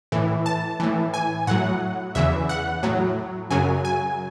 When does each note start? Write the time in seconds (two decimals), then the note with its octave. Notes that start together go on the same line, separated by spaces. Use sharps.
0.12 A2 E3
0.46 A5
0.80 A2 E3
1.14 G#5
1.47 A2 F#3 F#5
2.15 E2 C#3 E3 E5
2.49 F#5
2.83 A2 F#3
3.51 F#2 C#3 F#3 G#5
3.85 G#5